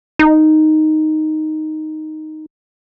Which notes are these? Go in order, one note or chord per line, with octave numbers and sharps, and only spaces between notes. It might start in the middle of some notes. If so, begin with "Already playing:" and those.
D#4